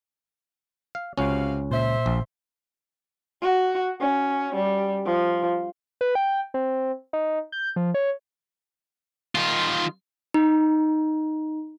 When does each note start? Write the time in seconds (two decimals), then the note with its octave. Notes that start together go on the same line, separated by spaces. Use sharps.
0.95 F5
1.18 C#2 C3 C#4 F#4 F5
1.71 A#2 C5 E5
2.06 A#1
3.42 F#4
4.01 C#4
4.55 G3
5.06 F3
6.01 B4
6.15 G5
6.54 C4
7.13 D#4
7.52 G6
7.76 F3
7.94 C#5
9.35 D#3 F4
10.34 D#4